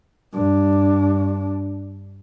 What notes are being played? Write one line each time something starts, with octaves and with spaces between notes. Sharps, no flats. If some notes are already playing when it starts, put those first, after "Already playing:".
G2 D4